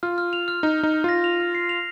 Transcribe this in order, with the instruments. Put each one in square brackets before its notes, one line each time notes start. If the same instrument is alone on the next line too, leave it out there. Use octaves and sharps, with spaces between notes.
[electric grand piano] F4 [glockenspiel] F6
[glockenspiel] F6
F7
F6
[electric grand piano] D#4 [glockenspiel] F6
[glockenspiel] F6
[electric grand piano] D#4
[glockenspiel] F6
[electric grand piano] F4 [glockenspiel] A#6
[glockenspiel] F7
F6
C7
F7